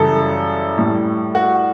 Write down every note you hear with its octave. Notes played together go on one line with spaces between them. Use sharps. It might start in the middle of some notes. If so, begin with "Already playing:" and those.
Already playing: F#2 C#3 E3 G3 A4
A2 G3
F#4